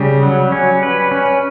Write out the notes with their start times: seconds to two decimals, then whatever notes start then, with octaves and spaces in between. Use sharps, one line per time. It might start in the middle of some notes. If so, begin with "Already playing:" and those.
Already playing: C#3 G3
0.23 F#3
0.52 C#4
0.83 B4
1.11 C#4